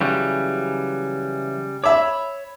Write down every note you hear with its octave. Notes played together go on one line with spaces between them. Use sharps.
C#3 E3 F#3 G3 C#6
C#5 E5 B5 D6 E6